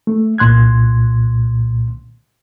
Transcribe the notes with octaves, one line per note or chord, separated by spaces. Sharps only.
A3
C2 A#2 C6 F#6 G#6